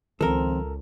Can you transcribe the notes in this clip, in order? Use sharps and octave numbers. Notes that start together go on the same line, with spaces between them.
C#2 D#3 F3 C4 C#4 A4 A#4